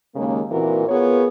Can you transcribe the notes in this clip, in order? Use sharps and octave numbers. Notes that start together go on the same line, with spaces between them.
D#2 C#3 G#3 A#3
A#2 E3 A#3 C4 F#4 A#4
B3 F4 G#4 A#4 C#5